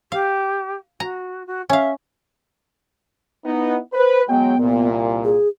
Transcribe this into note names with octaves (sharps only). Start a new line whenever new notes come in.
G4 F5
F#4 A#5
F#4
C#4 E5 F5
B3 D#4 E4
B4 C5
F#3 G#3 B3 G5
C2 A#2
G#4